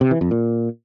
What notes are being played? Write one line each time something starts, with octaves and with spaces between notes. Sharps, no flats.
C3
E3
F2
A#2